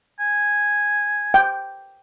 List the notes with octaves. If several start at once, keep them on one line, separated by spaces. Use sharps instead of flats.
G#5
G5